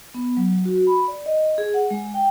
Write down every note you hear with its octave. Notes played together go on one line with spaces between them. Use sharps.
B3
F#3
F#4
B5
D5
D#5
G#4
F#5
G#3
G5